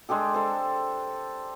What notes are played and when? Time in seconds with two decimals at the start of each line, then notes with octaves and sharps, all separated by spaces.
0.09 G#3 D4 G4 A4
0.34 A4 C5